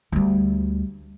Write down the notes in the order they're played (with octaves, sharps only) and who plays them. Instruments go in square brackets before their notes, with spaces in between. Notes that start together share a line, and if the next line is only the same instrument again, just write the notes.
[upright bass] D2 G3